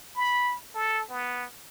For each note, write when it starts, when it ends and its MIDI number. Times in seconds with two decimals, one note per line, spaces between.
0.15 0.55 83
0.75 1.03 69
1.10 1.46 59